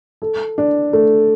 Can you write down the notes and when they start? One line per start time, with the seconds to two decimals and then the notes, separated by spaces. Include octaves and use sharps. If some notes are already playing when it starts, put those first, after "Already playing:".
0.22 A4
0.58 D4
0.93 A3